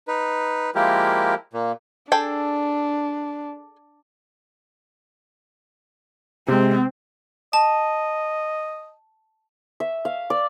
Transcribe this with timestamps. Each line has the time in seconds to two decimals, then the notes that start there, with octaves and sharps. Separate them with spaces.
0.08 D#4 B4
0.75 F3 G#3 A#3 E4 G4 A#4
1.53 A#2 A#3
2.12 D4 G#4 A4 G5
6.48 C3 G#3 C4
7.53 D#5 A5
9.80 E5
10.05 F5
10.30 D5